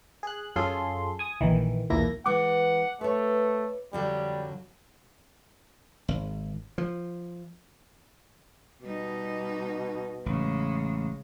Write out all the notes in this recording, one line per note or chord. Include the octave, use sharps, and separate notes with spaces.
G#4 F#6
F#2 C#4 F4 G#4 A4 C6
G#5 D#6
A#1 D#3 E3
B1 E2 A#2 A#3 E4 A#6
E3 G#3 B3 F#5 D6
A3 B4 C#5
F2 D3 F#3 G3
G#1
F3
B2 G3 D#4
A1 C#3 G#3